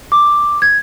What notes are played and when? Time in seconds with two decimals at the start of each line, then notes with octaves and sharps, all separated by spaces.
0.12 D6
0.62 G#6